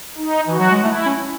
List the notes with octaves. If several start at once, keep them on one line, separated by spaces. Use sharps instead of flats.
D#4
E3 F#4
F#3
G#3
A3 E4
C#4